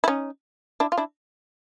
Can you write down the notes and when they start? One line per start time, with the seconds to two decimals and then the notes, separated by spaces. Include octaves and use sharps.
0.04 E4
0.08 C#4 D#4
0.80 D4 E4
0.92 F4
0.97 D4 E4